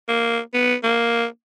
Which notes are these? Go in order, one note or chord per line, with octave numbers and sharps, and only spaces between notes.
A#3
B3
A#3